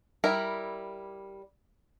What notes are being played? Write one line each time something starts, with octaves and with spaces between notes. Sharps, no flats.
G3 E4 A#4